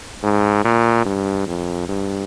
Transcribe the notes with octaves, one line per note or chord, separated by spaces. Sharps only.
G#2
A#2
G2
F2
G2